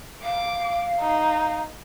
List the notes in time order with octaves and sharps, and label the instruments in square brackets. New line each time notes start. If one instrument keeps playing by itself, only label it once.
[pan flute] F5 [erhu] D6
[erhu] D#4